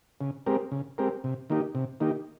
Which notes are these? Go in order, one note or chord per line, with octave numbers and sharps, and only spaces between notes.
C#3
G#3 C4 G4 A#4
C#3
G#3 C4 G4 A#4
C3
D#3 A#3 D#4 G4
C3
D#3 A#3 D#4 G4